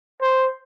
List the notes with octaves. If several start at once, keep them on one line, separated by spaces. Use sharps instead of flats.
C5